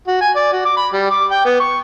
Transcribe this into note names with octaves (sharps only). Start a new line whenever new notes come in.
F#4
G#5
D5
F#4
D6
B5
G3
D6
G5
B3
C#6